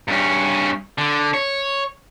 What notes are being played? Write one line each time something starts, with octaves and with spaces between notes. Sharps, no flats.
G2 C#4
D3
C#5